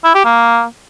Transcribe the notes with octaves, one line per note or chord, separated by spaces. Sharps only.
E4
G4
A#3